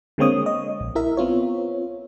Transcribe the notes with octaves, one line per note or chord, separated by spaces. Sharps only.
D3 G#3 A#3 C4 C#5 D#6
D#5
A#1
E4 A#4 E5
B3 C4 F4 C#5